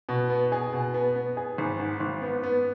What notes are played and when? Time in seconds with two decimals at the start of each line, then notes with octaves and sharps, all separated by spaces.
0.09 B2
0.30 B3
0.52 G#4
0.73 B2
0.94 B3
1.16 B3
1.37 G#4
1.58 G#1
1.80 G#2
2.00 G#1
2.22 B3
2.43 B3